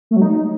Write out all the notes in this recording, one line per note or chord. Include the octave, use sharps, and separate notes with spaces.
A3
F#3
D#4